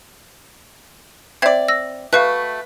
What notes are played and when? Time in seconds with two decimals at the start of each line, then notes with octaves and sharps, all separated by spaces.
1.42 C4 D5 E5 G#6
1.68 E6 A#6
2.13 A3 F#4 B4 F5 C#6 F#6